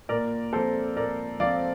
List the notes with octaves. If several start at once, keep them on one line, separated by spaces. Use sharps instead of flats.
A#2 A#4 D5
F3 C4 A4 C5
A#2 A#4 D5
F3 C4 D5 F5